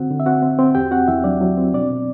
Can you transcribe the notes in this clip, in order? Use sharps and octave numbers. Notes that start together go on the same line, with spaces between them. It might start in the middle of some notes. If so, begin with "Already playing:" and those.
Already playing: D3 C4 F#4 F#5
D3
E5
C4 F#4 F#5
C4
C4
E2 G4 G5
C4 F#4 F#5
E2 E4 E5
F#3 D4 D5
F#3
C4
B2 D4 D5
B2